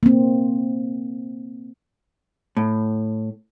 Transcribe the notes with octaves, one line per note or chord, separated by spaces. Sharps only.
A#3 C4
A2